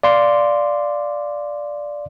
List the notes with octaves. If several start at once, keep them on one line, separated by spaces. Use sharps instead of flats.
D5 F5 C6